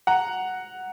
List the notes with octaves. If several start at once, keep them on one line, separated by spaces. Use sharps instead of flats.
F#5 A#5